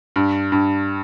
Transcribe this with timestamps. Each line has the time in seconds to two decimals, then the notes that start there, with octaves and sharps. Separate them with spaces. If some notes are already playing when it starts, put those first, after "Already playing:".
0.16 G2
0.52 G2